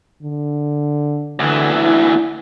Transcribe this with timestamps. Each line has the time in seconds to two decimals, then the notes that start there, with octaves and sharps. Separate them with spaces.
0.23 D3
1.39 D2 D3 E3
1.75 E4